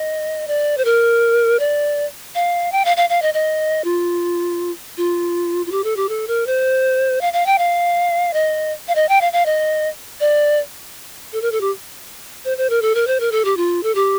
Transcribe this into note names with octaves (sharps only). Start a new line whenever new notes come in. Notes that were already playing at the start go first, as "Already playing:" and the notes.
Already playing: D#5
D5
C5
A#4
D5
F5
G5
F5
F5
F5
D#5
D#5
F4
F4
F4
G4
A4
G4
A4
A#4
C5
F5
F5
G5
F5
D#5
F5
D#5
G5
F5
F5
D#5
D5
A4
A#4
A4
G4
C5
C5
A#4
A4
A#4
C5
A#4
A4
G4
F4
A4
G4